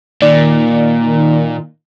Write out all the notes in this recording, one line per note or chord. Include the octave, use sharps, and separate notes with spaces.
A#2 D#3 D5